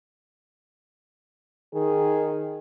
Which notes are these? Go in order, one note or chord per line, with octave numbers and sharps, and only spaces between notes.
D#3 G#4